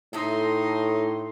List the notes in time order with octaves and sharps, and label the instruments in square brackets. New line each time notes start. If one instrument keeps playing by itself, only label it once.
[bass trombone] A2 [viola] D#4 C6 [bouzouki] A4 E5